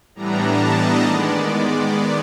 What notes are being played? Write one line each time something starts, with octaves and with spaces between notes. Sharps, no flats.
A2 E3 G3 B3 D4 A#5
A5
D#5
D#3 G#3 B3 D5